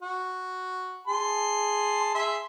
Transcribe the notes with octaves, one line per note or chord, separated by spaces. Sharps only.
F#4
G#4 A5 C6
G#4 E5 C6